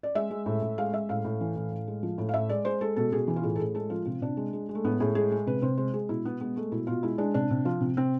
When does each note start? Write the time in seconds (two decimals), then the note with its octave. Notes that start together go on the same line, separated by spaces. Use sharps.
0.03 D5
0.15 G#3 E5
0.31 G#3
0.46 A2
0.62 A2
0.78 G#3 F5
0.93 G#3 E5
1.09 A2 F5
1.25 A2
1.41 E3
1.56 A2
1.71 A2
1.87 G#3
2.03 F3
2.18 A2
2.29 F5
2.34 A2 E5
2.49 G#3 D5
2.65 G#3 C5
2.81 G#3 A4
2.96 B2 A4
3.12 B2 G#4
3.28 E3
3.36 F4
3.43 A2 G#4
3.56 A4
3.59 A2 G#4
3.75 G#3 A4
3.90 F3 F4
4.05 C3 F4
4.21 C3 D4
4.37 G#3
4.53 G#3
4.69 G#3
4.75 A3
4.84 A2 B3
5.00 A2 G#4
5.15 G#3 G#4
5.32 G#3
5.46 C3 B4
5.62 C3 C5
5.78 G#3 C5
5.94 G#3 G#4
6.09 B2 E4
6.25 B2 B3
6.41 G#3 B3
6.56 G#3 A3
6.71 B2 E4
6.87 B2 F4
7.03 G#3 E4
7.18 G#3 D4
7.34 C3 D4
7.51 C3
7.65 F3 F4
7.81 C3
7.97 C3 C4